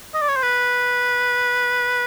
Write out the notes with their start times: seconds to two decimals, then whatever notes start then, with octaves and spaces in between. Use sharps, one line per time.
0.14 D#5
0.22 D5
0.29 C#5
0.36 C5
0.43 B4